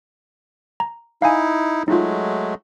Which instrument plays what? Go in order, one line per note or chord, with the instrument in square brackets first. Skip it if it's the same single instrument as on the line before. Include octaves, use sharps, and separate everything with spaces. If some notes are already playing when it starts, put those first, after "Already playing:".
[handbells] A#5
[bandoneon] D#4 E4 [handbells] F5 G#5
[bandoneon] F#3 G#3 A3 [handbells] D#4 F4